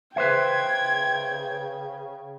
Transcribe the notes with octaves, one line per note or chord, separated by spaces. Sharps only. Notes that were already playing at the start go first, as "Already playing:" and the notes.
C#3 B4 C5 E5 G5 G#6